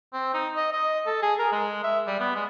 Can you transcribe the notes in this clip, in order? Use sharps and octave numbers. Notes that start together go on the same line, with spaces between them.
C4
D#4
D#5
D#5
A4
G#4
A#4
G#3
E5
G3
B3
G#3